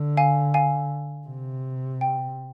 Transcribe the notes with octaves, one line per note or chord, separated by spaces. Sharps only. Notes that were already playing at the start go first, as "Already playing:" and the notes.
Already playing: D3
F5 G#5
F5 G#5
C3
G5